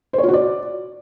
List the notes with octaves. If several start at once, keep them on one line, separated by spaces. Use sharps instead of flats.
C5
C#5
F4
F#4
D5